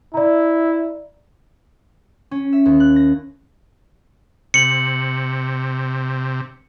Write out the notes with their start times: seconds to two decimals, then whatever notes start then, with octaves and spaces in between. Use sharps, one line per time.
0.14 E4 D5 A#5
2.31 C#4
2.52 E5
2.66 D#2
2.80 F#6
2.96 A#6
4.54 C3 C#7 F#7